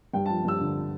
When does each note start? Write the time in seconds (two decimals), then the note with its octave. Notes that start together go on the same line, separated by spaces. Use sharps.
0.14 G2 G5
0.26 A5
0.30 F3
0.44 G2 E6
0.61 D3